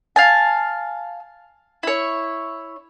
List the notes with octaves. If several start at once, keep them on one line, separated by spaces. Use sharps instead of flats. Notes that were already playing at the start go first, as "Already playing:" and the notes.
F5 G#5 A5
E4 C#5